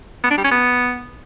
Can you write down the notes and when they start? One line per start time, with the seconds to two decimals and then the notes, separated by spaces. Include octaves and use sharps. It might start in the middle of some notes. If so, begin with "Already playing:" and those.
0.24 B3
0.31 D4
0.38 G3
0.44 C#4
0.51 B3